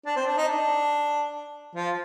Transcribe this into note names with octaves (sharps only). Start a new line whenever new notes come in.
D4
C4
D4
D#4
D4
F3